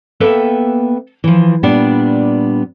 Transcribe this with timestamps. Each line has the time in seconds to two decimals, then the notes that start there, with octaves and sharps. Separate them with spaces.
0.20 A#3 B3 A4 B4 E5 G5
1.24 E3 F3
1.63 A#2 G3 B3 D4